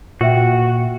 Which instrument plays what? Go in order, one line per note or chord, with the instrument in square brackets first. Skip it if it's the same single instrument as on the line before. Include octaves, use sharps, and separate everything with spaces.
[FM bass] A#2 [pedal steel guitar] F#4 [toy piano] B4 E5 G5